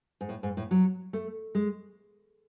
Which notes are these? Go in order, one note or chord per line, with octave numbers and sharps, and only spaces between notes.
G#2
A2
G#2
A2
F#3
A3
G#3